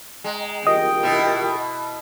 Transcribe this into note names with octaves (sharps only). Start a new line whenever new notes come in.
G#3 D#5 G5 A#5
F4 G4 A#4 D#5 G5
B2 E4